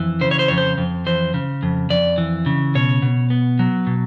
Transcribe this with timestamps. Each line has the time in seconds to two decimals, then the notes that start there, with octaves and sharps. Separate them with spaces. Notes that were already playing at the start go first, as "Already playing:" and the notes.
Already playing: F2 E3
0.21 C#3 C5
0.31 C#5
0.39 C5
0.48 F2 C#5
0.58 C5
0.78 F2
1.06 E3 C5
1.34 C#3
1.63 F2
1.90 F2 D5
2.18 E3
2.46 C#3
2.75 B2 C#5
3.02 B2
3.30 B3
3.59 F#3
3.87 B2